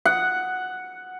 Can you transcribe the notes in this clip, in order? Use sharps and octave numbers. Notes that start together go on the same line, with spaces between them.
F#5